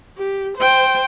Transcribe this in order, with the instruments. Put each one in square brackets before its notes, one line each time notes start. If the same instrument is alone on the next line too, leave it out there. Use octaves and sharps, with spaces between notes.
[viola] G4
C5 G5